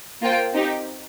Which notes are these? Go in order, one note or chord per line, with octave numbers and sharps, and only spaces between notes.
A#3 F4 C5 G5
C4 D#4 G4